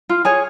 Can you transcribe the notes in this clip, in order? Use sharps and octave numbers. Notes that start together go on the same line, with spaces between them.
F4
G#4 C#5 G#5